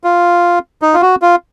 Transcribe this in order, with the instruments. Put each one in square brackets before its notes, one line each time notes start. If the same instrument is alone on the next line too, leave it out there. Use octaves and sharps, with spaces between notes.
[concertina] F4
D#4
F4
F#4
F4